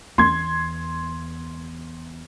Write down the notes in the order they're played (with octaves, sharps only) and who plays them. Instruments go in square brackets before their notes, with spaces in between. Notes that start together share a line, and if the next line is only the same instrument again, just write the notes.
[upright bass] E2 [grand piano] C6 G#6